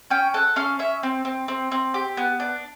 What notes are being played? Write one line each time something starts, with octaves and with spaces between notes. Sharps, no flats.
C#4 G5
A4 F#5
C#4 F5
C#4 E5
C4
C4
C4
C4
G4
B3
D4